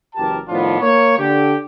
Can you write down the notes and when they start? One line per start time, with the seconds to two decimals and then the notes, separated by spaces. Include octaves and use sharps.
0.15 F#1 E3 G4 A#4 A5
0.48 A2 D#3 F3 B3 D4 F4
0.80 A#3 C#5
1.18 D3 G4